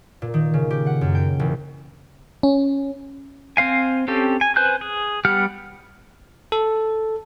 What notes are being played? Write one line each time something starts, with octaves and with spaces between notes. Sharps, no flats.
A#2
D#3
C#3
G4
F#5
F#2
G5
E1
C#4
C4 C5 F5 G#5
C4 C#4 G4 A4
G#5
B4 C5 G#5 F#6 G6
G#4
G3 B3 G4 F#5 F6
A4